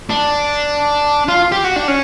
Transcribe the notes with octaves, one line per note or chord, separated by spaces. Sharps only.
D4
F4
G4
F#4
D4
C#4